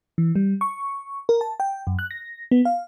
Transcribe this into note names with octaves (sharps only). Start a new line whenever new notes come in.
E3
G3
C#6
A#4
A5
G5
F#2
F#6
A#6
B3
F5